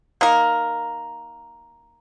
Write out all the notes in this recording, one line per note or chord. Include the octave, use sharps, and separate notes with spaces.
A#3 D#4 A#4